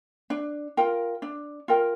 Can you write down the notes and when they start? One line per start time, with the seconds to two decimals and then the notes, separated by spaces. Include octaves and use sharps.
0.30 D4
0.77 F4 A#4 G5
1.22 D4
1.68 F4 A#4 G5